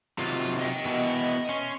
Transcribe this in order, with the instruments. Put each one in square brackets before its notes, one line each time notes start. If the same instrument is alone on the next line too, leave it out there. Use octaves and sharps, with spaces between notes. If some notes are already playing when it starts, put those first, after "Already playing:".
[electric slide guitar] C3 D#3 F#3 [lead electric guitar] F4
[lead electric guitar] D#5 G5
[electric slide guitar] B2 E3 B3
[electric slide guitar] C#4 [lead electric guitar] C6